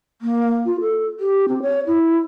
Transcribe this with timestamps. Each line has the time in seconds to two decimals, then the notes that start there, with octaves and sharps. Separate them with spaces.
0.22 A#3
0.66 F4
0.81 A4
1.20 G4
1.48 C4
1.62 C#5
1.87 E4